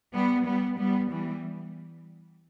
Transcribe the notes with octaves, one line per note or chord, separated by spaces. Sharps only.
G3 B3
G3 B3
G3 B3
E3 G3